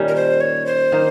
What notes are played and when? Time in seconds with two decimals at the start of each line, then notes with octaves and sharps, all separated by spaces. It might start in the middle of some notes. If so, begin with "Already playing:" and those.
Already playing: A#2 D#3 G3 C#4
0.08 A#4
0.16 C5
0.41 C#5
0.66 C5
0.92 D#3 A#3